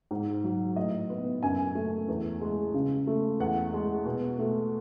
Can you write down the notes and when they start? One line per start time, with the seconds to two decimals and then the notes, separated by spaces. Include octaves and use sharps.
0.11 G#2
0.44 F#3
0.76 A2 D#5
1.10 B3
1.43 F#2 G#5
1.75 A3
2.08 E2
2.41 G#3
2.74 C#3
3.07 A3
3.40 E2 F#5
3.73 G#3
4.06 B2
4.39 A3